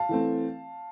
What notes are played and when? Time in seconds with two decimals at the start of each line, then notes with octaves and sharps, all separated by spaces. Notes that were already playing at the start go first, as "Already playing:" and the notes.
Already playing: F5 A5
0.09 E3 A3 C4